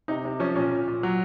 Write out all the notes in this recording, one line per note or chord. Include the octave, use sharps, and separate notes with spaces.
C3 D#4
C3
F3 C#4
A#2 C#4
A#2
A#2
F#3